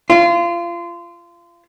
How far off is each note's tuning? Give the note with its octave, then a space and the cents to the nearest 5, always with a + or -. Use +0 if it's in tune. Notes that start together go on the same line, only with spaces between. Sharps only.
F4 -25